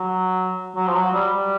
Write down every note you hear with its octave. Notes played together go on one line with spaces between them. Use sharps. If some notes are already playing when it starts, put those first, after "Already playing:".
Already playing: F#3
F#3
F3
F#3
G3
G3